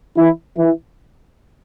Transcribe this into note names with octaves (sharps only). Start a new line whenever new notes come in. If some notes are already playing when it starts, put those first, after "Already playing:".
E3 E4
E3 E4